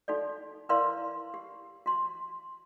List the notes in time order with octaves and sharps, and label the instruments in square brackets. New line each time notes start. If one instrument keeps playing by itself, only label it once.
[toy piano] D#4 F#4 A4 D5
E4 A#4 B4 D5 F5 C6
G4
F#4 C6